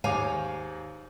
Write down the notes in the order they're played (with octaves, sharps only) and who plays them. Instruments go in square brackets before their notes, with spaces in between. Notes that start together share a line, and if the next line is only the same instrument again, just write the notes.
[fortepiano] D#2 G#2 D6 [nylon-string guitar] C#5 F5 G#5